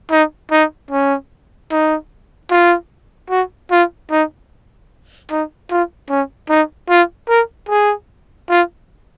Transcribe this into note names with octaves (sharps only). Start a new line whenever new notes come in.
D#4
D#4
C#4
D#4
F4
F#4
F4
D#4
D#4
F4
C#4
D#4
F4
A#4
G#4
F4